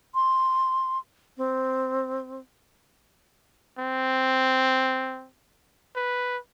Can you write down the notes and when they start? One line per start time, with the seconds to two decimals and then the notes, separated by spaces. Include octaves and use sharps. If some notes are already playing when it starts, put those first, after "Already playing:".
0.15 C6
1.37 C4
3.79 C4
5.96 B4